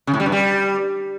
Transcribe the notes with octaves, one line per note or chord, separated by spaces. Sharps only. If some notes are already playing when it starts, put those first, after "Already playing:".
C#3
A2
G3
G2
G3